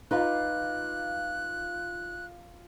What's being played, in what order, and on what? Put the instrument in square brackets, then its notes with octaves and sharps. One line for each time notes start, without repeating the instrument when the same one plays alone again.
[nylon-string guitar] D#4 B4 [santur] F4 A#5 D6 [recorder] F#6